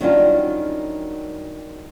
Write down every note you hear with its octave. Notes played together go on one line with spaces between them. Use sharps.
D#3 F#3 G3 C#4 D4 F4